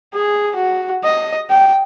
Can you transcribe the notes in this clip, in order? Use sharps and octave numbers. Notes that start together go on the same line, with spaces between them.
G#4
F#4
D#5
G5